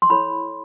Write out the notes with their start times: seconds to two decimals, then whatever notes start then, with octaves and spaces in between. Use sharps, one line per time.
0.02 C6
0.10 E4 A4 C#5 B5